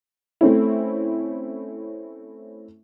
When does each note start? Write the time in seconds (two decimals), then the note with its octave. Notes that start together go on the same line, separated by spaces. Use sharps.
0.41 A3 C4 C#4 E4